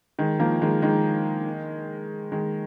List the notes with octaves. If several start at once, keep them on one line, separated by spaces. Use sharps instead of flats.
D#3 G#3
F3 A#3
D#3 G#3
D#3 G#3
D#3 G#3